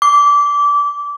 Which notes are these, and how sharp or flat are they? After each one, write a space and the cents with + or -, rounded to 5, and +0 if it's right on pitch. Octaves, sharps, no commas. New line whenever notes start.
D6 -20